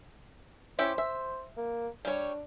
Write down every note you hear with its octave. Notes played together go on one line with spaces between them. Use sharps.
C#4 E4 G4 C5
E5
A#3
G3 D4 C#5